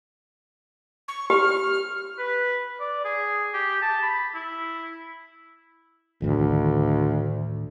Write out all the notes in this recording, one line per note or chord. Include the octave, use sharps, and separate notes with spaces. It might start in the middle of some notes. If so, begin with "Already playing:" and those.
C#6
G4 F6
B4
D5
G#4
G4
A5
B5
E4
D2 A2 D#3 E3